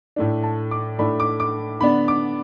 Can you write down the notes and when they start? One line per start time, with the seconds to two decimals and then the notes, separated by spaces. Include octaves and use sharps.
0.16 A2 A3 D4
0.43 A5
0.71 D6
0.99 A2 A3 D4 B5
1.20 D6
1.40 D6
1.81 D3 B3 D4 B5
2.08 D6